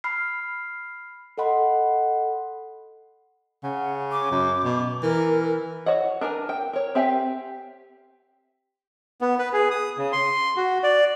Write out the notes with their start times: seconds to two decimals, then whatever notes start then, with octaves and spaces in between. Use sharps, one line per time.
0.04 B5 F6 C7
1.38 A4 D#5 F#5 B5 C6
3.63 C#3 F#5
4.12 D6
4.31 F#2
4.64 B2
5.03 E3 A#4
5.86 F#4 C#5 D#5 F#5
6.21 D4 A#4 B4 G#5
6.49 G5
6.73 A#4 C#5
6.95 C4 G4 E5 G5 G#5
9.21 B3
9.39 B4
9.53 G#4
9.71 D#6
9.98 C#3
10.12 C6
10.56 F#4
10.83 D5